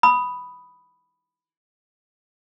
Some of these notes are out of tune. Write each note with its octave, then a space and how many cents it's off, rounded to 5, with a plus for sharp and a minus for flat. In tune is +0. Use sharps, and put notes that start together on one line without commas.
B5 +0 D#6 +0